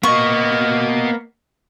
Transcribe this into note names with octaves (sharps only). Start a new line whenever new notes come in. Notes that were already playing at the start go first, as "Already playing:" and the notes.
A#3 B3 D#5 C#6